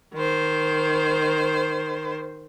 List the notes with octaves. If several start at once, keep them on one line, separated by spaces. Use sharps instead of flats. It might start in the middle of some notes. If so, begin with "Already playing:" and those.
D#3 C5